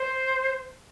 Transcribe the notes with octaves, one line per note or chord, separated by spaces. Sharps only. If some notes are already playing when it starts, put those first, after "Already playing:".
Already playing: C5